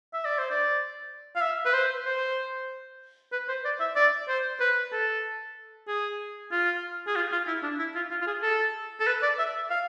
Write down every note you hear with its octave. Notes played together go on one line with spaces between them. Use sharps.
E5
D5
C5
D5
F5
E5
B4
C5
C5
B4
C5
D5
E5
D5
C5
B4
A4
G#4
F4
G#4
F4
F4
E4
D4
E4
F4
F4
F4
G#4
A4
A4
B4
D5
E5
F5